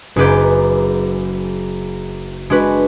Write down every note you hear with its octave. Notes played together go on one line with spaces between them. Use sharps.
F#1 D#4 G#4 B4 D6 G6
G#3 D4 F#4 B4